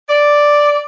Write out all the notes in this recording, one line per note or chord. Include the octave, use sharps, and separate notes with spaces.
D5